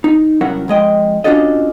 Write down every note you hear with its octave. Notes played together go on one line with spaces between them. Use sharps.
D#4
C2 F#3 C#4 E4 A#4 F#5
F2 G#3 D#5 G5
C#4 D4 F4 F#4 A4 D#5